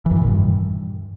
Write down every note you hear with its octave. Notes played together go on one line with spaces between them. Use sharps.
E3
F#2
D#3
A#2
G2